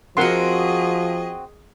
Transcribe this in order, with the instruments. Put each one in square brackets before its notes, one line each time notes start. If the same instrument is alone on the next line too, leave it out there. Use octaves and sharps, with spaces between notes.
[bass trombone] F3 [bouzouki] C4 F#4 [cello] G#4 D#5 [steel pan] A#4 F#5 C6